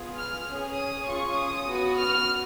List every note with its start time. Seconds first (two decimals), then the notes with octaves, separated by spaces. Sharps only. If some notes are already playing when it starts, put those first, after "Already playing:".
Already playing: B3 F4 G#4
0.17 F6
0.47 C#4 G#4
0.77 D#6
1.07 C#4 F4 G#4 C#6
1.37 D#6
1.67 B3 F#4
1.97 F6